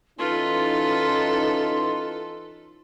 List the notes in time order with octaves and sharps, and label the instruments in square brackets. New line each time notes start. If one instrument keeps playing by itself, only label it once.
[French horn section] E3 C#4 D#4 [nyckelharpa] F4 B4 [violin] A4 [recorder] C6